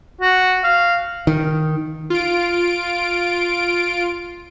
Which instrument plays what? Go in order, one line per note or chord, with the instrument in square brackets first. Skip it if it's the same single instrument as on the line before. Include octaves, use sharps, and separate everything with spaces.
[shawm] F#4
F5
[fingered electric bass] D#3
[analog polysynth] F4 D7